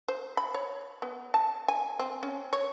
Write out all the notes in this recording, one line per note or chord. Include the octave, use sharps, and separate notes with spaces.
C5
B5
C#5
B3
A5
G#5
C4
C#4
C#5